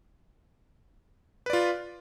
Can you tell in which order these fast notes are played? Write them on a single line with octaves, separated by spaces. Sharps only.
B4 D5 F4